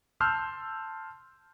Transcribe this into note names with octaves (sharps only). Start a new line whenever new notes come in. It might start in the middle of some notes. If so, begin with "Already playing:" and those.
A5 C6 E6 F6 G6